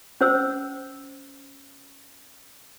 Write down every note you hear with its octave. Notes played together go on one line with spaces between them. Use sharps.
C#4 C5 E6